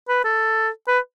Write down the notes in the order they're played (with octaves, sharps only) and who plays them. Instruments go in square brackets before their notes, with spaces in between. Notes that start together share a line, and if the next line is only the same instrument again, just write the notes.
[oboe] B4
A4
B4